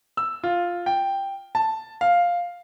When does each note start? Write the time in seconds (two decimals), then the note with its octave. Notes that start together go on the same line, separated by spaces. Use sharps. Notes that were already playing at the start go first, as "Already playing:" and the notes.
0.17 E6
0.44 F4
0.86 G5
1.55 A5
2.01 F5